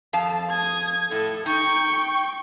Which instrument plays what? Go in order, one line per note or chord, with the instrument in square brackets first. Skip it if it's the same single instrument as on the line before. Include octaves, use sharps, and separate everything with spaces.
[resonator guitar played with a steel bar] F2 F5 A5
[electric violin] D#6 G#6
[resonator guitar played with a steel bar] A2 [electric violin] A4
[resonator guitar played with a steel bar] D#4 [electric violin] G5 C#6